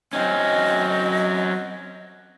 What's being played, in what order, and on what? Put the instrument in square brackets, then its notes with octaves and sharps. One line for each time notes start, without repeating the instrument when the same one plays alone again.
[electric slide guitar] F#3 C4 C#4 [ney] D#5